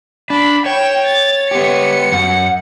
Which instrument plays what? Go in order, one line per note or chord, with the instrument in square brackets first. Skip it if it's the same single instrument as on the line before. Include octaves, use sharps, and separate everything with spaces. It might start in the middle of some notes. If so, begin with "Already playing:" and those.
[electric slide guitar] D4 [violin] B5
[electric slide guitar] C#5 [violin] G5 E7
[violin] A6
[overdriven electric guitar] B3 G4 [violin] C#7
[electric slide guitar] F#2 [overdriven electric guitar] F#5